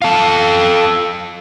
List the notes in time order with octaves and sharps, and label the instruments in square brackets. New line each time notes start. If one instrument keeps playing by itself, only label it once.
[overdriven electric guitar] F4 A4